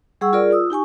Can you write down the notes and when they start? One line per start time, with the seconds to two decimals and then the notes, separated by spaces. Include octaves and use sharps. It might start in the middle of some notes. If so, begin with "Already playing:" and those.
0.21 G3 G#4 F#5 C#6 E6
0.33 F4 G#4 A#4 D5
0.51 F4 D#6 E6
0.70 D#4 G4 G#5 C#6